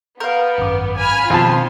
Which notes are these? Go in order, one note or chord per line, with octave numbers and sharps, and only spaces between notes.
B3 A#4 F5 G6
G#1 F#2 D6
G#5 B5 F6
F2 B2 D#3 F4 A5 C6